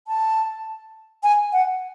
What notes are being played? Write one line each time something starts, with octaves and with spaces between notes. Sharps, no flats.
A5
G#5
F#5